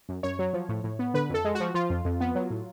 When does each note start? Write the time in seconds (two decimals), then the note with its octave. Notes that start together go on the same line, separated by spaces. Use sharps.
0.09 F#2
0.23 F#2 C#5
0.39 F#3
0.54 F3
0.69 A2
0.84 A2
0.99 B3
1.14 D3 B4
1.29 F2 A4
1.45 G#3
1.55 F#4
1.60 F3
1.74 F3 F4
1.90 F2
2.05 F2
2.21 B3
2.35 F#3
2.50 A2